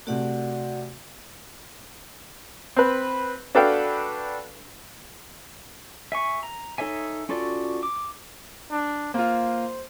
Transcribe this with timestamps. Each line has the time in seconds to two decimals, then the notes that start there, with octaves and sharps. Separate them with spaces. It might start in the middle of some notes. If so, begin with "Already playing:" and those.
0.07 C3 A3 F#4 D5 F#5
2.76 C4 B4
3.55 D4 F#4 A4 B4 F5 G5
6.12 E5 G#5 C#6
6.43 A#5
6.78 D#4 A4 C#5 E5 G#5
7.29 C#4 F4 F#4 A4 D5
7.83 D6
8.71 D4
9.14 A#3 F4 C5